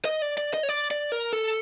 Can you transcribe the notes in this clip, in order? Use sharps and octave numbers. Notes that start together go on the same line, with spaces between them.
D#5
D5
D5
D#5
C#5
D5
D5
A#4
A4